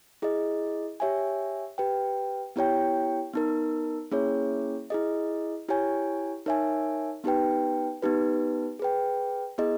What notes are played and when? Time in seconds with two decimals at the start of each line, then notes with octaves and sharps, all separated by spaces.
0.22 E4 G#4 D#5
1.00 G4 C#5 E5 G#5
1.78 G4 B4 G5
2.56 B3 E4 G4 C#5 G5
3.33 B3 D#4 A#4
4.12 A#3 C#4 E4 G#4 C#5
4.90 E4 G#4 D#5
5.68 E4 G4 C#5 G#5
6.46 D#4 A#4 C#5 E5 G#5
7.24 B3 D#4 G4 B4 G5
8.02 B3 D#4 G4 B4
8.79 G#4 B4 G5
9.58 B3 E4 G#4 D#5